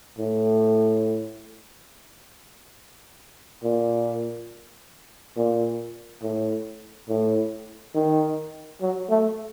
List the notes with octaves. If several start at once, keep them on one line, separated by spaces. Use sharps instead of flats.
A2
A#2
A#2
A2
A2
D#3
F#3
A3